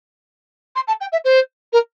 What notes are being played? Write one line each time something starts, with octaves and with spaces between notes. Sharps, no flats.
C6
A5
G5
E5
C5
A#4